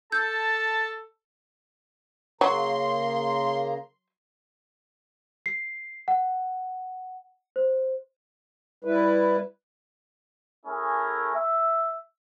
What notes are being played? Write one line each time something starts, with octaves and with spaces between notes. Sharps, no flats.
A4 A5 G6
C#3 F#3 A#3 A#5 C6
C7
F#5
C5
G3 E4 B4
A3 C#4 E4 G#4 A#4
E5